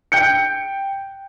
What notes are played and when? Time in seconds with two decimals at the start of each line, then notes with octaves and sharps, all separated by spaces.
0.12 G5 G6 C#7